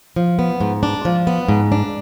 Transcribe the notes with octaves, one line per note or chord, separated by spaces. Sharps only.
F3
B3
G#2
D4
F3
B3
G#2
D4